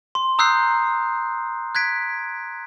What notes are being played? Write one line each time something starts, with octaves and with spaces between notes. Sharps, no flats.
C6
A#5 D#6 E6 F#6 G6 C7
F#6 G#6 B6 D7